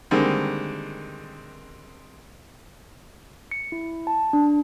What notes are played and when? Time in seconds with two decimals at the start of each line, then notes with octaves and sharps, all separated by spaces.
0.11 D3 D#3 G3 G#3 A#3 C4
3.51 C#7
3.72 E4
4.07 A5
4.33 D4